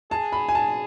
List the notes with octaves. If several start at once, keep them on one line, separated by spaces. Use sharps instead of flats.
G#4 A5
B5
G#5
A5